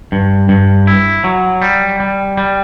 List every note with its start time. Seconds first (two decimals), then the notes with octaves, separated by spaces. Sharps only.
0.12 G2
0.49 G2
0.87 E4
1.24 F#3
1.62 G3
2.00 G3
2.37 G3